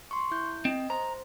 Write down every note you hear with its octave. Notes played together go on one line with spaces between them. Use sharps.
C6 C#6
E4 G6
C4 D#5
C5 A#5